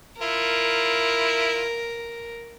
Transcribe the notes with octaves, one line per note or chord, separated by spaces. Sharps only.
E4 F4 A#4